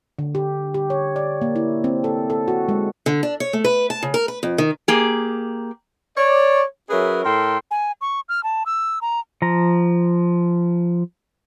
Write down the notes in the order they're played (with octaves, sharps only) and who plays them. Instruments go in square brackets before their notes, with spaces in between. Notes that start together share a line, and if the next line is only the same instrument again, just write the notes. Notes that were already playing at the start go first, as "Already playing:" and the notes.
[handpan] D3
G4
G4
C#5
D5
A#3
E4
C4
A4
A4
F#4
G#3
[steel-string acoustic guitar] D3
D4
C#5
A3
B4
A5
C#3
A#4
B4
F2
D#3
[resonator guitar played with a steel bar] A#3 G4 G#4
[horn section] C#5 D5
F#3 C#4 G#4 A#4 B4 E5
A2 A4 A#4 G5 C6
[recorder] G#5
C#6
F6
A5
E6
A#5
[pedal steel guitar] F3 A#5